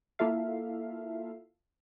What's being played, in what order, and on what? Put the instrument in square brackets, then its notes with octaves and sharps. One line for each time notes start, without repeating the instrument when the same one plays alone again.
[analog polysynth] A#3 E4 F4 A4 E5 F5